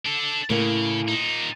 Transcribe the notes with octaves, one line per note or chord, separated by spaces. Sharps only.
D4 A4
A2 C#3 A#3
A#2 D#4